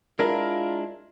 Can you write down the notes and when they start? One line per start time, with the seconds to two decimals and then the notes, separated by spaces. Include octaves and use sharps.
0.19 G#3 D4 E4 F4 A#4